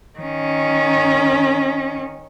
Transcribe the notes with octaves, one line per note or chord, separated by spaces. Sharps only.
D#3 C#4